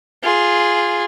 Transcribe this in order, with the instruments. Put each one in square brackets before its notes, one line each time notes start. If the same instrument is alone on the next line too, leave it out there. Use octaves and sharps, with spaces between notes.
[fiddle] F4 G#4